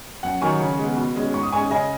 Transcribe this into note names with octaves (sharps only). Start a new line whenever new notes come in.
F#2 F#5
D#3 F#3 G#5 C#6
C#3
G#3 B3
B2
G#3 C#4
G#2 C#6
D#6
G#3 C#4 G#5 C#6
C#3 D#5 G#5